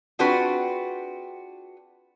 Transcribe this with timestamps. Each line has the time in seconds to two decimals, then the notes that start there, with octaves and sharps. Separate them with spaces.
0.19 C4 D4 F4 F#4 G#4 B4